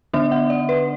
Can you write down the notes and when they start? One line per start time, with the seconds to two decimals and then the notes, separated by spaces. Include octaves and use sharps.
0.13 D3 B3 D4 E5
0.32 F#5
0.50 D5
0.69 B4